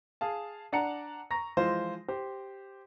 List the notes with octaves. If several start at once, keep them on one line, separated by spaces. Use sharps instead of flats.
G#4 F5 A5
D4 D5 F#5 A5 A#5 C#7
A#5 C#6 A#6
E3 F3 G#3 F4 C5
G4 C5